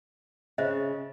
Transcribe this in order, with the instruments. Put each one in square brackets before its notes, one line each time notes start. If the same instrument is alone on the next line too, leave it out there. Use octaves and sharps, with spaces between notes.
[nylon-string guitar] C#3 [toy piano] C5 D#5 E5